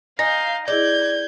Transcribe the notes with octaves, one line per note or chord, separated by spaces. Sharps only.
D#4 F5 G#5 G6 A#6
E4 G#4 D5 D#5 G6 G#6